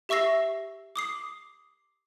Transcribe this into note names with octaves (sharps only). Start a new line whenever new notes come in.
G4 E5 C#6 E6 A#6 C7
D6 D#6 C7